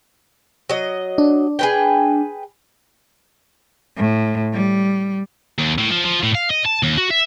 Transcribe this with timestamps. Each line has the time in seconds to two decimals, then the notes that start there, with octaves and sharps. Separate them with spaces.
0.69 F#3 D#5
1.18 D4
1.59 G#4 B4 G5
3.97 A2
4.53 G3
5.58 D#2
5.78 A2
5.91 F3
6.05 F3
6.23 A2
6.35 F5
6.51 D#5
6.66 A5
6.83 D#2
6.97 F#4
7.10 E5